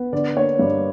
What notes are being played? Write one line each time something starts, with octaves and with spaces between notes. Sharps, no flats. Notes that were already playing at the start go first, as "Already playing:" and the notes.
Already playing: B3
D3 D5
A#3 C#5
G2 D5